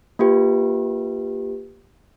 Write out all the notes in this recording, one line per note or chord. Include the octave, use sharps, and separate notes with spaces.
A#3 F4 G4 B4